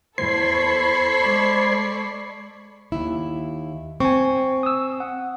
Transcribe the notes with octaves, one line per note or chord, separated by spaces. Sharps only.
E2 A4 C5 B5 C#6 G#6 C7
G#3 D5
D#2 E4
C4 G#5 C#6
D#6 E6
F#5